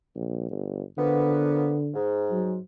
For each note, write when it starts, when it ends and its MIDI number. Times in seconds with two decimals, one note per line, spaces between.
0.15 0.49 34
0.51 0.82 31
0.98 1.93 50
0.98 1.76 53
0.98 1.76 58
0.98 1.76 59
1.94 2.54 44
2.31 2.58 54